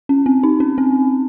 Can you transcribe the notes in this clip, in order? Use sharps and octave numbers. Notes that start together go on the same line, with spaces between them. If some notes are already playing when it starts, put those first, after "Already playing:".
C#4
C4
D#4
C#4
C4